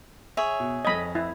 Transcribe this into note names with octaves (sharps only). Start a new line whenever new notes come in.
G#4 C#5 E5
B2
F2 D#5 B5 G#6
E4